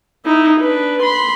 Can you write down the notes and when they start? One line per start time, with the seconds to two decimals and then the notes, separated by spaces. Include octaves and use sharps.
0.25 D#4 E4
0.60 D4 B4
1.03 B5 C6